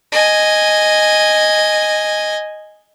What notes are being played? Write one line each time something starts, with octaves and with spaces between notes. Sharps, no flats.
D#5 G#5